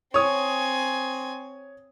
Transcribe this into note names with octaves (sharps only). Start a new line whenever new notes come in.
C4 C#5 G#5 D#6